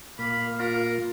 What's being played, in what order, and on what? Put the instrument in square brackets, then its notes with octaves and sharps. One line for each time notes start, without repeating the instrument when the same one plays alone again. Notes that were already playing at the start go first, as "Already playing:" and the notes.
[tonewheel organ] A#2 A#3 [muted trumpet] F5 [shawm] B5
[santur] F4 [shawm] A#4